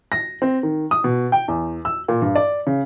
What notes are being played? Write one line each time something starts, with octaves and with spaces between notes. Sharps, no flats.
A#6
C4
D#3
D#6
B2
G5
E2
E6
A#2
G2
D5
C#3